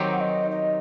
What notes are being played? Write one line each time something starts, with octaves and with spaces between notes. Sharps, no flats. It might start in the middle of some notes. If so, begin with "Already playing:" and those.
Already playing: D#3 F#3 C4 D#4 G4
F#5
D#5
D#5